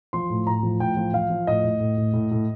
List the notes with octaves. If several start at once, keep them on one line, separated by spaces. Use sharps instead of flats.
F3 C6
A2
A2 A#5
F3
A2 G5
F3
F3 F5
F3
A2 D#5
A2
A2
A2
A2
A2